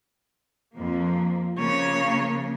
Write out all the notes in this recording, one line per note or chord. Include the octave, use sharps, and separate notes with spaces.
F2 F3 A#3
C#3 F3 A#3 C#5